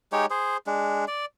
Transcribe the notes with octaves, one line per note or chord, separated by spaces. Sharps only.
G#3 D#4 G4 C#5
G#4 C5
G#3 D4
D5